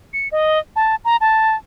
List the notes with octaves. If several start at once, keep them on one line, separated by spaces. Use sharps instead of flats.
C#7
D#5
A5
A#5
A5